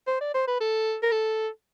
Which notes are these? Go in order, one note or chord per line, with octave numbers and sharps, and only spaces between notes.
C5
D5
C5
B4
A4
A#4
A4